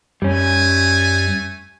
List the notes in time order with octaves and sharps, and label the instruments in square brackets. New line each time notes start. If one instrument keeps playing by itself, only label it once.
[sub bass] F#2 [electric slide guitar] G3 C#4 [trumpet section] A3 G#5